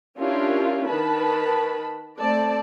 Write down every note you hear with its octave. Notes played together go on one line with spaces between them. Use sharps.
C#4 D4 E4 F4 G4 A#4
D#3 B4 A5 B5
A3 C4 D5 A5